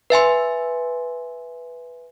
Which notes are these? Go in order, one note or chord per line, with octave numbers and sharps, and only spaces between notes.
B4 E5 G#5 C6